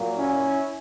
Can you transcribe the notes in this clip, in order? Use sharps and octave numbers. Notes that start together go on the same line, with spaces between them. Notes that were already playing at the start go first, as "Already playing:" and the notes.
Already playing: A#2 F#3 A#3
C#4 E4